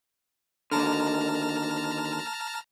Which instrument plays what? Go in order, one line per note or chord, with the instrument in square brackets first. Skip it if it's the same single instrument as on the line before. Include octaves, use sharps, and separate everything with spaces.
[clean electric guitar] D#2 D3 [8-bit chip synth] A5 A#5 F6